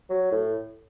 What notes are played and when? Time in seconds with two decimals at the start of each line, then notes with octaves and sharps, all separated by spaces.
0.10 F#3
0.32 A2